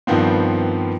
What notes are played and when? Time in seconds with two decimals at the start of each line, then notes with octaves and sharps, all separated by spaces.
0.07 G2 D#3 F3 B3 C4